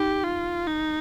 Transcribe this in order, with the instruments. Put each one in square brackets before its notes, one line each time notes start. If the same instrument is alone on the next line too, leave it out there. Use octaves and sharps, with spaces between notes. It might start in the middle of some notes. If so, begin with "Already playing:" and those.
Already playing: [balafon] D#4 [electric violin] G4
[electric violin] F4
D#4